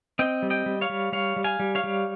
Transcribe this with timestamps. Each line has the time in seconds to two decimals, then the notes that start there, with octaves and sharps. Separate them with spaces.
0.19 C4 D#5 G5
0.42 G3
0.50 D#5 G5
0.66 G3
0.81 C#5 F5
0.89 G3
1.12 G3 C#5 F5
1.36 G3
1.44 F5 G#5
1.59 G3
1.75 C#5 F5
1.84 G3